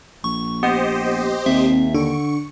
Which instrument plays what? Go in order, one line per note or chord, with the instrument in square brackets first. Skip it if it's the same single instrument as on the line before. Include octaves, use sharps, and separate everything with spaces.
[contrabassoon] A#1 [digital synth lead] C#6
[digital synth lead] B3 [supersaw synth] G4 C5 D#5
[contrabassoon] D#2 [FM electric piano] C4 [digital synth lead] E5
[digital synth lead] D3 [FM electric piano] D4 [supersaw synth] C#6